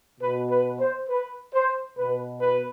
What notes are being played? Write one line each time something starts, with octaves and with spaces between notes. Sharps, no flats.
B2 B4
B4
C5
B4
C5
B2 B4
B4